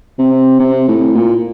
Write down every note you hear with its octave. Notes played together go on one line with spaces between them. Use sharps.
C3
C3
A2
A#2